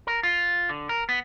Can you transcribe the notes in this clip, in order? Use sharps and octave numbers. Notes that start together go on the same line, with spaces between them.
A#4
F4
D3
A#4
B3